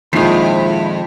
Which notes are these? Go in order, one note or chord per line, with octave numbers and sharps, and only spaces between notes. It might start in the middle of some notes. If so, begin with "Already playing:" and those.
F2 A#2 D#3 G#3 E4 E5 B6 C7